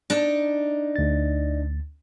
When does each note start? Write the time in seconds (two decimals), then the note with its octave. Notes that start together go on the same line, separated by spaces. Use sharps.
0.10 D4 D#4
0.96 D2 A6